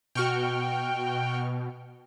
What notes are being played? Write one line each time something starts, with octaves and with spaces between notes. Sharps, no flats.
B2 F#4 G5 C#6 F6